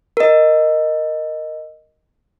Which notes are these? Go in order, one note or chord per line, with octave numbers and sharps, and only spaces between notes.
A#4 D#5